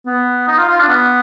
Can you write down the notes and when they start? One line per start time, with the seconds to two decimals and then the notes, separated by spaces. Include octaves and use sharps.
0.06 B3
0.48 D#4
0.58 F4
0.69 F4
0.79 D4
0.89 B3